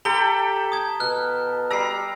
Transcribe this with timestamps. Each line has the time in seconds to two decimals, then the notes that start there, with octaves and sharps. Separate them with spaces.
0.05 G4 A4 G5 A#5 B5 G7
0.72 D#6 G#6
1.00 B2 F6 F#6
1.71 G3 A#5 E6 C7